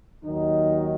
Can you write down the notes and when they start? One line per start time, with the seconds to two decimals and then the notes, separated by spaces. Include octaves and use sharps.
0.24 D#2 D#3 F#3 D#4